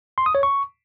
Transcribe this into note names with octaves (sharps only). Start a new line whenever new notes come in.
C6
D#6
C#5
C#6